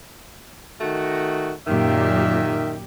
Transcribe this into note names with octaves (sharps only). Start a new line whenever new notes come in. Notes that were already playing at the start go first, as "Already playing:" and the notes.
D#3 A3 F#4
F#2 A#2 D#3 G4 E5